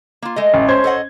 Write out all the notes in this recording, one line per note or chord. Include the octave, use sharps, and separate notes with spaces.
A#3 F4
G#3 A3 D#5
A1
C#4 C5 G#6
A4 D#5 F#5